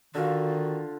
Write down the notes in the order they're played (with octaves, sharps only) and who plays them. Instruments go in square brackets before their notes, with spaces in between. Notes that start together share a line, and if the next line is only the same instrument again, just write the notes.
[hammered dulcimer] D3 F4 [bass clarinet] D#3 [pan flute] F#4